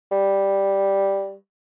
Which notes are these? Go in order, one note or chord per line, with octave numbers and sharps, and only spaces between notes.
G3